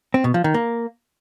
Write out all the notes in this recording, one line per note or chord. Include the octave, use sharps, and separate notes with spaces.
C4
B2
F3
D#3
A#3